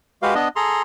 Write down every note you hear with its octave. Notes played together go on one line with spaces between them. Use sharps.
G#3 F#4 G4 B4 F5
B3 D4 D#5
G#4 A4 A#5 C6